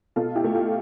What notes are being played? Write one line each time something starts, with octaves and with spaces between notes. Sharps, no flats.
B2 F4 A4
E4 G4
A3
F4